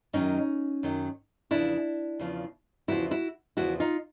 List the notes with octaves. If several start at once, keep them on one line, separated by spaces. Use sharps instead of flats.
F#2 D#3 F#3 C#4 D#4
F#2 D#3 F#3
E2 C#3 F3 D4 E4
E2 C#3 F3
E2 C#3 F3 E4 F#4
E4 F#4
E2 C#3 F3 E4 F#4
D#4 F4